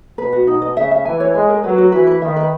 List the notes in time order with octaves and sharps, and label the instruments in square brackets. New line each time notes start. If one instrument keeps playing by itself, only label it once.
[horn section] B2 [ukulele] B4
[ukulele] F#4
[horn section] B2 [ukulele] D#4
[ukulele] D#5
[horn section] C#3 [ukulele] E5
[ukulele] E5
[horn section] E3 [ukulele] G#5
[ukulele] C#5
[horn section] G#3 [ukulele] G#5
[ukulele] A#4
[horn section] F#3 [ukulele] B4
[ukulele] F#4
[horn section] E3 [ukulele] B4
[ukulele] B4
[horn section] D#3 [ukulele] E5
[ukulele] B4